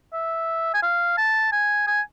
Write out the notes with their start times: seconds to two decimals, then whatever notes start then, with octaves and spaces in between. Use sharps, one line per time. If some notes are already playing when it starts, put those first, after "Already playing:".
0.13 E5
0.74 G#5
0.82 F5
1.17 A5
1.52 G#5
1.87 G#5